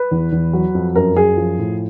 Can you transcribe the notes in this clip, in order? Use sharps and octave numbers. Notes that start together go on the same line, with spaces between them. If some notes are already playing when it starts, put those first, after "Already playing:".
Already playing: B4
E2
E2
F#3
F2
F#2 A#4
F#2 G#4
F3
A2